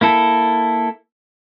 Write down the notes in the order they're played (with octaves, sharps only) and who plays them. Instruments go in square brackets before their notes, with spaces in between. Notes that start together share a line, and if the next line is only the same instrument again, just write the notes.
[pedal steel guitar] A#3 E4 A4